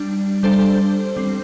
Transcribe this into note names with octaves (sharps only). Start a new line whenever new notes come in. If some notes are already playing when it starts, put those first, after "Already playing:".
Already playing: G3 D4
G3 D4 A4 C5
G3 C4